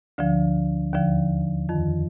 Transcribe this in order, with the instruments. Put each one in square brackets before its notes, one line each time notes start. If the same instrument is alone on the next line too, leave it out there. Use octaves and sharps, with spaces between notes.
[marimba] D2 D3 F3
D#2 D3 F3
F2 D#3